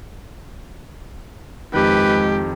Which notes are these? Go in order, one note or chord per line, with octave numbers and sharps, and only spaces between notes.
F2 D#3 G#3 G4 B4